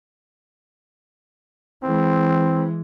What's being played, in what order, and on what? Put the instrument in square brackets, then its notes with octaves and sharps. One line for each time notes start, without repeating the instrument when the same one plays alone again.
[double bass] E3 G#3 [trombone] C4